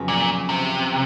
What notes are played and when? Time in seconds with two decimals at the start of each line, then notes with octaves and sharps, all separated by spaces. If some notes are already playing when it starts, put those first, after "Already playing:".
Already playing: F2 C#3 F#3 B3
0.08 A#2
0.49 C3